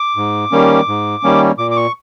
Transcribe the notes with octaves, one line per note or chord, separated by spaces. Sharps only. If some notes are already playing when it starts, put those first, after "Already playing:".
Already playing: D6
G#2
D#3 G3 A#3 C#4
G#2
D#3 G3 A#3 C#4
A#2 D6
D6
C#6